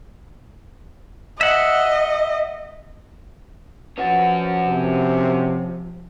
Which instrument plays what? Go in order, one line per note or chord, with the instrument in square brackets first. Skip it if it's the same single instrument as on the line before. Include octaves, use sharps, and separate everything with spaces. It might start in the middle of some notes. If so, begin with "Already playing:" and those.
[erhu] D#5 [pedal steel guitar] E5 F#5
[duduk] F3 [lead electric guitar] C#4 F#4 [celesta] B4 F#5 A6
[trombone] C3